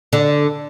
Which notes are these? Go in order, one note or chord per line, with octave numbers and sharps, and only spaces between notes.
D3